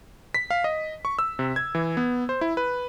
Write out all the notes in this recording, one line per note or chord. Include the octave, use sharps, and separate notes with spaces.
B6
F5
D#5
C#6
E6
C3
G#6
E3
B3
C5
E4
B4